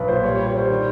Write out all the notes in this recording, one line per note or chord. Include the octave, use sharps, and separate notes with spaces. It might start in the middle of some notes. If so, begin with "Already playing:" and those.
Already playing: B1 B4
A#2 C5
G3 C#5
C#5
G3
C#5
G3 C5
D#3